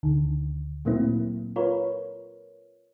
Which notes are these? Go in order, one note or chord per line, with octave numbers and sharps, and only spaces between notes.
D2 D3 D#3
A#2 F#3 A3 A#3 C4 E4
F4 A#4 B4 C#5